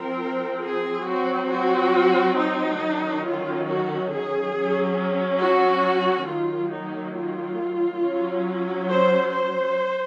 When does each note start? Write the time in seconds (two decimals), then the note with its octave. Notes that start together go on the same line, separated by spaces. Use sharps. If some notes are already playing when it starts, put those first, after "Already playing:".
Already playing: F3 C4 A#4
0.61 G#4
1.05 F#3 C4 F#4
1.49 F#4
2.36 D#4
2.80 D#3 F#3 C#4
3.23 F4
3.67 F#4
4.10 G#4
4.54 F#3 C#4
5.41 F#4
6.28 D#3 F#3 A#3 F4
6.72 D#4
7.16 F4
8.03 F#3 C#4
8.90 C5
9.33 C5